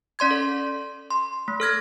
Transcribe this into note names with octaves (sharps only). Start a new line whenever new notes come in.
C#4 D5 C6 G#6
A4
C6
A3
A4 F6 G#6 A#6